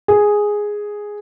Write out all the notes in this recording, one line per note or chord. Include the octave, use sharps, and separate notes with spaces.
G#4